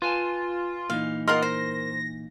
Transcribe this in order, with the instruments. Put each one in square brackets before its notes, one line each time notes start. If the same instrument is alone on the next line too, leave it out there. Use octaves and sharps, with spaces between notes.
[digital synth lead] F4 [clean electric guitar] B4 G#5 A5
[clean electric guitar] A#2 E3 D#4 [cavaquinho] F5
[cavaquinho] F4 F#5 C6 [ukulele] A#4 [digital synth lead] D#5
[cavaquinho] C5 [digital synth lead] A#6